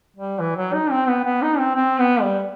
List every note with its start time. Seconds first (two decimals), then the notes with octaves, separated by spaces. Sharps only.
0.17 G3
0.39 E3
0.56 F#3
0.73 D#4
0.90 C4
1.08 B3
1.25 B3
1.42 D#4
1.58 C4
1.76 C4
1.99 B3
2.22 G3